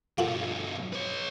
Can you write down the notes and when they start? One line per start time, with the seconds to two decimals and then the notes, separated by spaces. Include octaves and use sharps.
0.18 G2 B2 F4 F#4 A4
0.93 B4 C#5